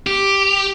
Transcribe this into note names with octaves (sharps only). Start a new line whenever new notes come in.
G4